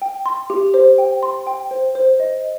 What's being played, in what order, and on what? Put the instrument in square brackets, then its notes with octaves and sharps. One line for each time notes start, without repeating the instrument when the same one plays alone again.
[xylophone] G5
C6
G4
C5
G5
C6
G5
C5
C5
D#5